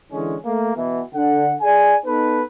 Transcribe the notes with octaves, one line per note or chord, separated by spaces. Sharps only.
D3 E3 G#3 C#4
A3 A#3
B2 E3
D3 F#5
G#4 D5 G#5
B3 D#4 A4 B4